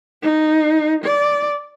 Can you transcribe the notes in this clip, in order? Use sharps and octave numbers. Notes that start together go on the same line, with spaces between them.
D#4
D5